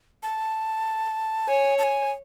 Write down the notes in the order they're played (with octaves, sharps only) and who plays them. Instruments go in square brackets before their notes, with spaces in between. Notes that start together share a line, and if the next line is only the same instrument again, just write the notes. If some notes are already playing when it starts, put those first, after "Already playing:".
[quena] A5
[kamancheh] C#5 [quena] G#5
[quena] A5
G#5